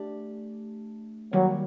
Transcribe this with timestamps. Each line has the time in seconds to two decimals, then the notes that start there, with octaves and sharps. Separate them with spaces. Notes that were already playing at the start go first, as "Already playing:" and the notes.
Already playing: A3 D4 G4 D5
1.33 D#3 F#3 G3 A#3 F#4